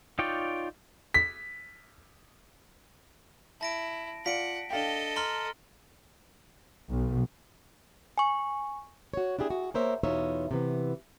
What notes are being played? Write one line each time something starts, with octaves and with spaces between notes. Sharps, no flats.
D#4 F4 C#5 D5 G5
B6
E4 A5 A#6 D7
F4 D5 F5 F#5 B6 D7
D4 A4 D#5 F5 G5
A#5 C6 F6 G7
B1
G#5 C#6
F#4 C#5
D4 E4 G4 G#4
F#4
A#3 A#4 C5 C#5 E5
E2 B2 D#4 F4 C#5 E5
C3 E3 B3